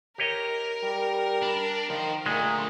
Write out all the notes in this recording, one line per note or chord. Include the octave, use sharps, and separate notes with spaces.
G4 A#4 C#5 D#5
G3
D4
D#3 C5 F5
A#2 D3 G#3 A3